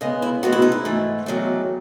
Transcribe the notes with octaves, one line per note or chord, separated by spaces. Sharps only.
C#3 G#3 B3 D#5
E4
A2 G#3 B3 F#4
E4
D#4
E4
G#2 E3 A3
E2 D#3 F#3 A3